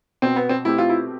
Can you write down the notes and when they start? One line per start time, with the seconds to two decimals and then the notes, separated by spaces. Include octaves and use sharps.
0.22 B2 C4
0.36 B3
0.49 C4
0.65 A3 C4 E4 G4
0.78 F4
0.89 E4